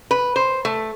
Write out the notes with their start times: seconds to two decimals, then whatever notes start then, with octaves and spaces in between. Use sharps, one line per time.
0.11 B4
0.36 C5
0.65 A3